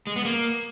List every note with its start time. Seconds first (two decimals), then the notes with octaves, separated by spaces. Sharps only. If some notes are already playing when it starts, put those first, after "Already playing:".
0.07 G#3
0.16 B3
0.25 A#3